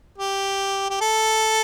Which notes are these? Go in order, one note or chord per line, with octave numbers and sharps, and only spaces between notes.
G4
G4
A4